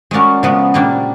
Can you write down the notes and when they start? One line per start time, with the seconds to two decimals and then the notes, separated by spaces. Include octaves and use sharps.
0.11 G#3 C#4 F#4 A#4 D5
0.43 C#3 F3 G#3 B3
0.74 A#2 G3 A#3 D4